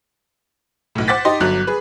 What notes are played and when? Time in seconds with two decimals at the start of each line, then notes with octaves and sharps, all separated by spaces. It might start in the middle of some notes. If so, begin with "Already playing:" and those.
0.95 B1 A2
1.08 C5 F#5 D6 A6 B6
1.25 D#4 G4 D#5 C6
1.40 G1 F#3 F#6
1.67 G#4 B4